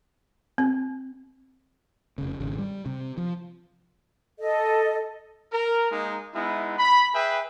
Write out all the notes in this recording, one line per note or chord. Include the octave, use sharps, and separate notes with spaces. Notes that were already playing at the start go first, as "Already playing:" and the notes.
C4
F1 C#3
G#1 C#3
G3
C3
F3
A4 D#5
A#4
G#3 A#3 D#4
G#3 B3 D#4 E4
B5
G#4 B4 E5 G5 G#5